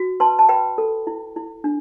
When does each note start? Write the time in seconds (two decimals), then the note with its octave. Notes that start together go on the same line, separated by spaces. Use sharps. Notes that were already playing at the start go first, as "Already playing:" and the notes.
Already playing: F#4
0.20 B4 A5 C6
0.39 A5
0.49 B4 G5 B5
0.78 A4
1.07 E4
1.36 E4
1.64 D4